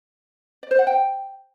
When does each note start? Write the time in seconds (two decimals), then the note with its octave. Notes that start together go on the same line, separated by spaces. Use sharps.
0.63 D5
0.71 C5
0.79 F#5
0.87 G5